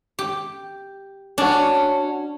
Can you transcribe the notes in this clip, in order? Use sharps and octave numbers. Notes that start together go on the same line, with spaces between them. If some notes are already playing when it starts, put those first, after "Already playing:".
G4
C#4 D4 F#4